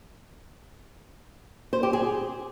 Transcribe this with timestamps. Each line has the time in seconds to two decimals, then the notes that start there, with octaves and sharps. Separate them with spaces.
1.73 C5
1.83 G4
1.93 G#4